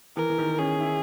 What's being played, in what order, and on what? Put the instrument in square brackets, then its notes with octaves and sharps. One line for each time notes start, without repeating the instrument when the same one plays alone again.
[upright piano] E3 [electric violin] A#4
[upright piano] E3
D#3
[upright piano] C#4 [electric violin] G#4
[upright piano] E4